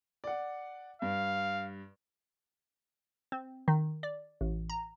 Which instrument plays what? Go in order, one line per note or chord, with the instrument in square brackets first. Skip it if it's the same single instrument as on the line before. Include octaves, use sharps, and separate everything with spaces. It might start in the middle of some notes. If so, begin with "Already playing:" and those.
[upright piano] D5 F#5
[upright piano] G2 [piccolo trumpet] F5
[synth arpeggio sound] C4
D#3
D5
A1
A#5